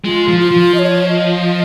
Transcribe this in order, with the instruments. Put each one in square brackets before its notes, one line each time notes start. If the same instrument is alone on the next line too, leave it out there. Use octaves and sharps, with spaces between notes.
[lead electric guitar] G#3 [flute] F4
[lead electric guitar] F3
[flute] F4
[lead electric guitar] F3
[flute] D#5
C#5
D#5